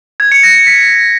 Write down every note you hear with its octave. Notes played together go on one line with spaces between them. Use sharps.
G#6
C#7
A#6
C#7
B6